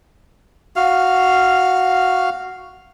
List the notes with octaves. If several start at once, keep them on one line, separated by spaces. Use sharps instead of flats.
F#4 F5